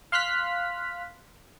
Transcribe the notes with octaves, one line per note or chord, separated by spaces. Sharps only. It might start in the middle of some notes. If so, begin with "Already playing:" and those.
F5 C6 F6 F#6 B6